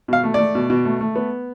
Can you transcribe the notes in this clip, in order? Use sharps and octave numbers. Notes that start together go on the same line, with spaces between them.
B2 F5
A3
A3 D5
B2
B2
A3
A3
B3